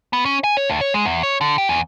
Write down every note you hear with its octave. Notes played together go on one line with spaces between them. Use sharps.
B3
C#4
G#5
C#5
D2
C#5
G#3
E2
C#5
D3
G4
E2